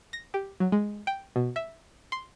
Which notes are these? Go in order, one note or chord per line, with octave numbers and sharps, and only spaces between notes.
A#6
G4
F#3
G#3
G5
B2
E5
C6